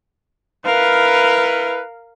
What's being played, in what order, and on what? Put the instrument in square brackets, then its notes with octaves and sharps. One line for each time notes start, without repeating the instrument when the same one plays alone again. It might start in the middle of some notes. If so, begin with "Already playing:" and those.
[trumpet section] E4 B4 [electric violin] A#4 F5